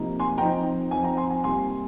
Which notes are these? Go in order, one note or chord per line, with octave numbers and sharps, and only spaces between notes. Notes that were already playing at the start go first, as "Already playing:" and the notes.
Already playing: C3 F3 A#3 D#4
G#5 C6
F3 C4 D#4 G5 A#5
F3 C4 D#4 G#5
G5 A#5
G#5 C6
G#5
C3 G3 A#3 D#4 G#5 C6